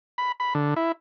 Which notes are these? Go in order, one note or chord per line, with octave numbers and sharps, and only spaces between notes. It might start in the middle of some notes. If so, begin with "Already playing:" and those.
B5
B5
D3
E4